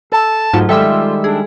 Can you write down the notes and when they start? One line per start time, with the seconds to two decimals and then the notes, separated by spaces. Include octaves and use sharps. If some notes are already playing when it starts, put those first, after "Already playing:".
0.12 A4 A5
0.53 G#2 F#3 A3 F4
0.69 D#3 G3 G#3 F4 A4 E5 G5 E6
1.24 D4 G#4